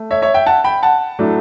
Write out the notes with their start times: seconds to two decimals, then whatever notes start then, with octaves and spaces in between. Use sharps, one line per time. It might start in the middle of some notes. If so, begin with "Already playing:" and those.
Already playing: A3
0.11 C#5 E5
0.22 C#5 E5
0.34 E5 G5
0.46 F#5 A5
0.64 G5 B5
0.82 F#5 A5
1.19 A2 F#3 A3 D4